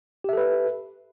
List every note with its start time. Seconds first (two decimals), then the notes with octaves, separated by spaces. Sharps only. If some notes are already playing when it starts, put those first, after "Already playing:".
0.24 G4
0.29 E5
0.33 A4
0.37 B4